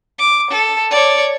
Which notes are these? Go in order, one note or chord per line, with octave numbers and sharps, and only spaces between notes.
D6
A4
C#5 D5